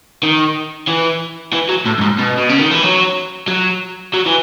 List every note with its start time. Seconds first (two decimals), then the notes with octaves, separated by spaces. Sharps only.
0.23 D#3
0.87 E3
1.53 E3
1.69 F#3
1.86 A2
1.98 F#2
2.01 G#2
2.19 B2
2.38 B2
2.49 C#3
2.60 D#3
2.71 E3
2.83 F#3
3.48 F#3
4.14 F#3
4.26 E3